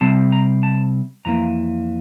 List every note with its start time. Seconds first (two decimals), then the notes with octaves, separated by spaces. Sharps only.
0.01 C3 G3 C4 A5
0.32 A#5
0.63 A5
1.25 F2 E3 A#3 A#5